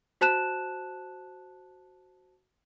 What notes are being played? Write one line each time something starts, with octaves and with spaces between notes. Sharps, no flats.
F#4 C5 A5 F#6 E7